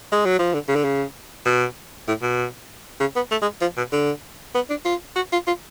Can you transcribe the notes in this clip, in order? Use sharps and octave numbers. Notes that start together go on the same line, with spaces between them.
G#3
F#3
F3
D3
C#3
D3
C#3
B2
A2
B2
C#3
B3
A3
G#3
F3
B2
D3
B3
D4
F4
F#4
F4
F4